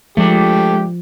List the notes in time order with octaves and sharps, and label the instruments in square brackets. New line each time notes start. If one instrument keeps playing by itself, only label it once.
[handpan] F3 [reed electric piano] G#3 [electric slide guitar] A3 D4 [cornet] G4